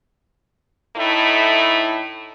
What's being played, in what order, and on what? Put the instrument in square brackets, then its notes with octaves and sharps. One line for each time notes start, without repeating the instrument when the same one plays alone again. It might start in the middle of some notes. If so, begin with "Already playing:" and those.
[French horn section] A2 A3 D#4 E4